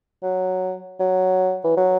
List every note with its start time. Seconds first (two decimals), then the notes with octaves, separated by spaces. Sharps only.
0.23 F#3
1.00 F#3
1.64 E3
1.77 F#3